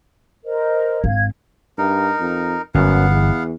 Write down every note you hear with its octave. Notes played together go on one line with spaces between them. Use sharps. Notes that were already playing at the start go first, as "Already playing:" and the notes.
A#4 C5 D#5
G#1 F5 G#6
G2 D#4 A#4
F2
G1 F#2 B3 F5 F#5
E2